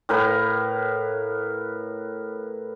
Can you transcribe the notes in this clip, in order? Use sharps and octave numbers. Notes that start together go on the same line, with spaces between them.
A2 A#4 B4 F5